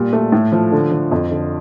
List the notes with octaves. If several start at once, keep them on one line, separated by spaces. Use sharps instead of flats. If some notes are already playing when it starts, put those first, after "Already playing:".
Already playing: A#2 G3
A3
A2
F3
D3
F3
F2
D3